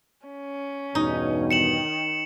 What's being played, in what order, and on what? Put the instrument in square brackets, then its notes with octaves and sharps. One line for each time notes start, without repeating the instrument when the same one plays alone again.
[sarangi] C#4
[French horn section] E2 G2 B2 [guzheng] D#4
[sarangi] D#3 [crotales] C#7 E7 F#7